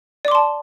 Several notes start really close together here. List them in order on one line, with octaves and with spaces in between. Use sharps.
D5 D6 C6 A5